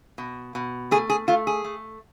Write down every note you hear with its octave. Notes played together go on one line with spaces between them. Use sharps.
B2
B2
A3 G#4
G#4
A3 F4
G#4
A3